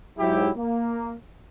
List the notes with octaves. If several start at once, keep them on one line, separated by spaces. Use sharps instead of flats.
G#2 F#3 E4 G4
A#3